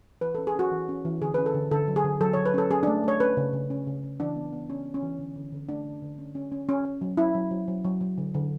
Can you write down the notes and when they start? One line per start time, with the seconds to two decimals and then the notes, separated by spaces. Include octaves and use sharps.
0.21 E3 B4
0.35 C#4 A4
0.47 G#4
0.55 C#4 F#4
0.71 E3
0.89 C#4
1.05 E3
1.21 D3 G#4
1.34 C#4 B4
1.46 A4
1.54 D3
1.71 D3 A4
1.88 F#3
1.96 G#4
2.04 D3
2.21 F#3 A4
2.33 F#3 C#5
2.46 B4
2.54 C#4 A4
2.71 C#4 G#4
2.83 D4
2.87 A3
3.04 A3 C#5
3.20 C#4 B4
3.37 C#3
3.53 C#3
3.70 C#4
3.87 C#3
4.03 C#3
4.20 E3 D4
4.36 B3
4.53 B3
4.69 B3 C#4
4.86 B3
4.94 C#4
5.03 E3
5.19 D3
5.36 D3
5.52 D3
5.69 A3 D4
5.85 D3
6.02 D3
6.18 C#4
6.35 C#4
6.52 C#4
6.69 C#4
6.85 C#4
7.01 F#3
7.17 C#4 E4
7.35 F#3
7.51 F#3
7.68 F#3
7.84 F#3
8.01 F#3
8.18 D3
8.34 D3